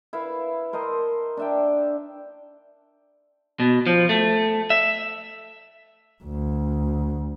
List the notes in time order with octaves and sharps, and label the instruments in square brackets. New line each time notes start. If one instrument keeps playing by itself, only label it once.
[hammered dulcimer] E4 B4 E5 F5
A#4 C5 D#5 A5
D4 E5 G5
[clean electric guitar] B2
F3
A3
E5
[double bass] D2